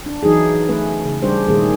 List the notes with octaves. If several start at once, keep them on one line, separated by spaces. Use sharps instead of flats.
D4
E3 F#3 D#4 G#4
A3 C#4 B4
C#3
G3 C#4 D4 G4 C5
A#2 D#3 G3 A3 C#4 G#4